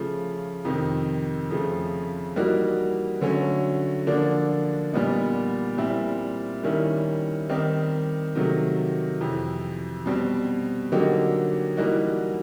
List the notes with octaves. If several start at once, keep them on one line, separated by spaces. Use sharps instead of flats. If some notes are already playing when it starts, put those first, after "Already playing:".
Already playing: C#3 F3 A3
F2 C3 D#3
F2 C#3 F3 A3
E3 G3 A#3 D#4 F#4
D3 F#3 A3 C#4
D3 F3 A#3 D4
A#2 G3 B3 D#4
A#2 G3 C4 E4
D#3 G3 A#3 C#4 E4
D#3 G3 C4 D#4 G4
C3 D#3 F#3 A3
F2 C3 E3
B2 G3 C4
D3 F#3 A#3 D#4 G4
E3 G3 A#3 D#4 F#4